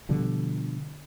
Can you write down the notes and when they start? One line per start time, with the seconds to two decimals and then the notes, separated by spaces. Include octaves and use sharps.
0.09 B2 D3 F3 G3